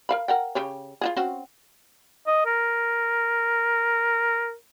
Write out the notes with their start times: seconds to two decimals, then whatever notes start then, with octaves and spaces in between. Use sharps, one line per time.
0.09 A#4 F5 B5
0.28 A#4 F#5 G5
0.55 C#3 G4 C#5
1.01 F4 F#4 G#4
1.16 C4 C#4 F#4
2.27 D#5
2.46 A#4